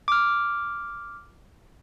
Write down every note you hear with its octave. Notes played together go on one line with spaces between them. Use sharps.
D6 F6